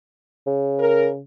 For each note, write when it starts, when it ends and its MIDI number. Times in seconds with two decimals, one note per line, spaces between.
0.46 1.20 49
0.79 1.08 70